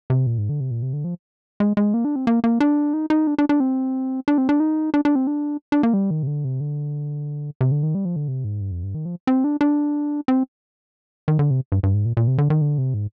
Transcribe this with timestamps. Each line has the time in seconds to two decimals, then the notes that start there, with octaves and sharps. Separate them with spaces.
0.10 C3
0.27 A#2
0.38 G#2
0.49 D3
0.60 C3
0.71 A#2
0.82 C3
0.93 D3
1.04 F3
1.60 G#3
1.77 G#3
1.94 A#3
2.05 D4
2.16 C4
2.27 A#3
2.44 A#3
2.60 D4
2.93 D#4
3.10 D#4
3.27 D4
3.38 D4
3.49 D4
3.60 C4
4.28 D4
4.38 C4
4.49 D4
4.60 D#4
4.94 D4
5.05 D4
5.15 C4
5.27 D4
5.72 D4
5.83 A#3
5.93 G3
6.11 D#3
6.23 C3
6.27 D3
6.44 C3
6.60 D3
7.61 C3
7.71 D3
7.83 D#3
7.95 G3
8.05 F3
8.16 D3
8.28 C3
8.44 G#2
8.61 G2
8.71 F2
8.83 G2
8.95 D#3
9.05 F3
9.27 C4
9.44 D4
9.61 D4
10.28 C4
11.28 D#3
11.39 D3
11.50 C3
11.72 G2
11.83 G2
11.94 G#2
12.05 A#2
12.17 A#2
12.27 C3
12.38 D3
12.50 D#3
12.61 D3
12.78 C3
12.94 G#2